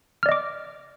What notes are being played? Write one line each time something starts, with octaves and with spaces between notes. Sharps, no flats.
D5 D#5 D6 F6